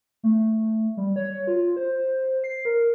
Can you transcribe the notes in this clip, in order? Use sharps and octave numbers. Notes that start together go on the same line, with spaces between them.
A3
G3
C#5
F4
C5
C7
A#4